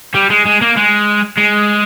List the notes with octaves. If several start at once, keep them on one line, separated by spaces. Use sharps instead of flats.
G3
G#3
G#3
A#3
G#3
G#3